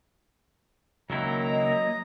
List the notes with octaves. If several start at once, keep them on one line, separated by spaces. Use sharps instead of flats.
C#2 D#3 F#3 A#3 E4 A#5
D#5